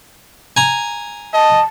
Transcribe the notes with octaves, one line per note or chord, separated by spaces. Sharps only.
G#5 A#5
D#5 A5